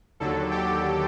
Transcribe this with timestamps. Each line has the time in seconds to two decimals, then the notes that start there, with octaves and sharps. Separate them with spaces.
0.20 D#2 D3 F#3 A4
0.51 G4